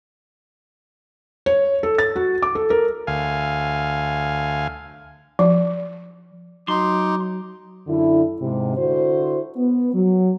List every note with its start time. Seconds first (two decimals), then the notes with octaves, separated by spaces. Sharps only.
1.46 C#5
1.83 A4
1.98 A6
2.16 F#4
2.43 D6
2.55 A4
2.70 A#4
3.07 D2 F5 G#5
5.39 F3
6.68 F#3 D#4 C6 D6
7.88 F#2 D3 E4
8.41 G#2 C3
8.78 D3 E4 F#4 C5
9.56 B3
9.94 F#3